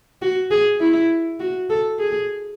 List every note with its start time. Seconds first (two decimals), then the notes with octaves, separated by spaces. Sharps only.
0.22 F#4
0.51 G#4
0.80 E4
1.40 F#4
1.70 A4
1.99 G#4